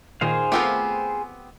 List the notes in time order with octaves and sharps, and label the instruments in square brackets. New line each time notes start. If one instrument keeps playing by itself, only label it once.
[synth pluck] A#2 D#3 [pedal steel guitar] G#4 C5 F5
[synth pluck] A3 F4 A#4 [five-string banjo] B3 C4 G4